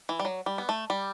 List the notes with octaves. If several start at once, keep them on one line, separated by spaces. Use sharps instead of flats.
E3
G3
F#3
G3
B3
A3
G3